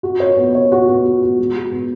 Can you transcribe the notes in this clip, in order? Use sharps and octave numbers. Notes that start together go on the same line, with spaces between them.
F#4
C#5
B3
C#5
F#4
B3
F#4
F#4
G#3
F#4
B3